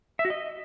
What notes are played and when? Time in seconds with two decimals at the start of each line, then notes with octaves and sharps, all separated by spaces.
0.19 E5
0.25 F#4
0.30 D#5